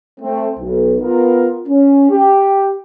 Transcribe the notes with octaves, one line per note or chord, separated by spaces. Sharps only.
A3 C4
B1
B3 F4 A#4
C#4
G4